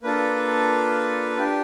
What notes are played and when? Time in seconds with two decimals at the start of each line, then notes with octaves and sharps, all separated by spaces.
0.03 A#3 D4 F4 A4 B4
1.37 D4 G4